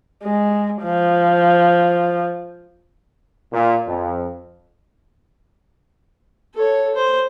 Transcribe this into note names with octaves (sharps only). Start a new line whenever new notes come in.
G#3
F3
A#2
F2
A4 C#5
C5